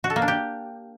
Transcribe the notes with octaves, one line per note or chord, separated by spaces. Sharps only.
F#4
A4
A#3
D4
G4